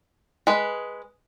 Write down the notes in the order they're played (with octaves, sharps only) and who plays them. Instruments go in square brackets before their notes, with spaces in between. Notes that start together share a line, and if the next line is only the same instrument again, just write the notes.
[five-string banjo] G#3 B4